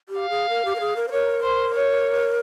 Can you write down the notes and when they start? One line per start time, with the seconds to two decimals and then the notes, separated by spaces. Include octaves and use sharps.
0.09 G4
0.19 F5
0.30 G#4
0.49 A#4
0.65 G4
0.75 A#4
0.80 G#4
0.96 A#4
1.08 C5
1.12 A#4 C#5
1.43 C5
1.74 C#5